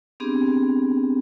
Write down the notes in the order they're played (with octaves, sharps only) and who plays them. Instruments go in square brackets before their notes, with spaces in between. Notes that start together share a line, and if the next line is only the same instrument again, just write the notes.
[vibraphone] B3 C4 D4 G4 G#4